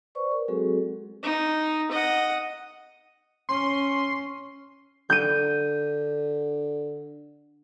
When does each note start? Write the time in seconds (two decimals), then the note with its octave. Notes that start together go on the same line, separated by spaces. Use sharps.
0.15 B4 C5 D5 C#6
0.31 A#4
0.48 F#3 G#3 C4 F#4 G#4 A4
1.23 D#4
1.91 D#5 F#5
3.49 C#4 C6
5.10 D3 G6 D#7